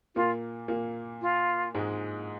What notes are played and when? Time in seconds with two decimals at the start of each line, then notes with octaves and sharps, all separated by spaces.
0.15 A#2 A#3 F4
0.68 A#2 A#3
1.21 F4
1.75 G#2 G#3